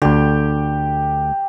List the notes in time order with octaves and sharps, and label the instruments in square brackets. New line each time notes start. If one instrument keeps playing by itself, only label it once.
[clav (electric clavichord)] D2 D3 [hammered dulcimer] G4